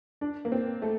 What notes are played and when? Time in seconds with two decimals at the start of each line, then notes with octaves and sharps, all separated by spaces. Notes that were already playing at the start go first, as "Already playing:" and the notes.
0.21 D4
0.45 A#3
0.52 C4
0.82 A3